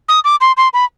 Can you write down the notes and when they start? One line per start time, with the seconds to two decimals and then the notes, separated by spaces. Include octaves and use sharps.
0.08 D#6
0.24 D6
0.41 C6
0.57 C6
0.73 B5